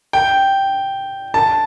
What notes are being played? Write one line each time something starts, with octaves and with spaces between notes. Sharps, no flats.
G5
A5